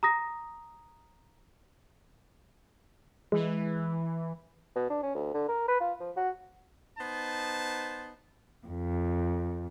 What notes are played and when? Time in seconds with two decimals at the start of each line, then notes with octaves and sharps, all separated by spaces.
0.03 A#5 D#6 A#6
3.32 E3 G#3
4.76 B2
4.90 D4
5.03 C#4
5.15 D2
5.34 D3
5.48 A#4
5.68 B4
5.80 F4
6.00 F3
6.17 F#4
6.99 B3 D#4 C5 A5
8.67 F2